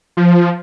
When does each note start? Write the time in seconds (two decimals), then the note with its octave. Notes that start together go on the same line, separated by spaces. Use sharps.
0.17 F3